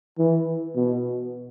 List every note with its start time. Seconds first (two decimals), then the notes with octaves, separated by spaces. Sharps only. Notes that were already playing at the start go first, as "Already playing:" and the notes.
0.18 E3
0.76 B2